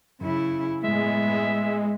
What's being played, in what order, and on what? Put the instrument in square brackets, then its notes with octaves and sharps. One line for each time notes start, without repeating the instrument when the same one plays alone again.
[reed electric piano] F#2 [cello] C#3 E4
[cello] A2 B3 [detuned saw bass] G#3 [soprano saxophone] E5